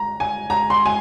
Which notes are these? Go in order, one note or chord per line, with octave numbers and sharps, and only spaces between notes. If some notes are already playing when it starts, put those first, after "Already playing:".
Already playing: A#5
G#5
A#5
C6
G#5